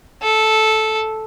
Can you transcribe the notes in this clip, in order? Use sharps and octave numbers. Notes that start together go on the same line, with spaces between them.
A4